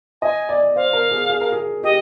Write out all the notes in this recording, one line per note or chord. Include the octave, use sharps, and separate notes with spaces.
D#5 G#5
D5
C5 F5
A#4
G#4
G#4
A#4
G#4
G4 D#5